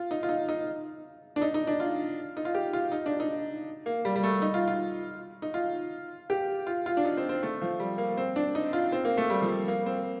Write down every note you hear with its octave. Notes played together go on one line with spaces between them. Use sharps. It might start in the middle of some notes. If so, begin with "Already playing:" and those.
Already playing: F4
D#4
F4
D#4
D#4
D4
D#4
D#4
D4
F4
D#4
F4
G4
F4
D#4
D4
D#4
A#3
G3
G3
A3
D#4
F4
F4
D#4
F4
G4
F4
F4
D4
D#4
C4
C4
A3
F3
G3
A#3
C4
D4
D#4
F4
C4
A#3
A3
G3
F3
G3
A#3
C4